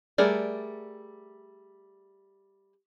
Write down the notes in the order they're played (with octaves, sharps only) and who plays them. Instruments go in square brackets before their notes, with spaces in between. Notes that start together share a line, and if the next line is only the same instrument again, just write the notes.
[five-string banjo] G3 A3 G#4 A#4 D5